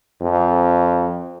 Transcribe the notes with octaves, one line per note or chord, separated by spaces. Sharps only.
F2